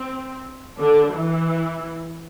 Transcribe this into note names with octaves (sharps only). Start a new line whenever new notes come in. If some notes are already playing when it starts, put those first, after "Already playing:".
Already playing: C4
D3 D4
E3 E4